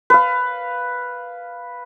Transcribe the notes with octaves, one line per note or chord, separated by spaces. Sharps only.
B4 F5